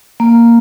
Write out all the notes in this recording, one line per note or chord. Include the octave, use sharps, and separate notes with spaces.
A#3